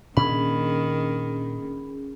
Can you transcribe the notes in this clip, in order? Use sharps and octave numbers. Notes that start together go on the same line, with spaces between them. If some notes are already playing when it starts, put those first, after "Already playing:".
A#2 D#3 C#4 D4 G#4 B5